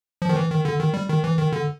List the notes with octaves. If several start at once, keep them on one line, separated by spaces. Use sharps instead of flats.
F3
D#3
E3
D#3
D3
D#3
G3
D#3
E3
D#3
D3